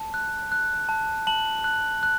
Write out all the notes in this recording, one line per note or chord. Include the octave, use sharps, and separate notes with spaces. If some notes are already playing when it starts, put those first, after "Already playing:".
Already playing: A5
F#6
F#6
A5
A5 F#7
F#6
F#6